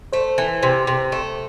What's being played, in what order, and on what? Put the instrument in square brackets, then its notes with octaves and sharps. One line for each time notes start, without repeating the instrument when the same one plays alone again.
[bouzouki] A3 [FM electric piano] C5
[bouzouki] E3
C3
C3
A3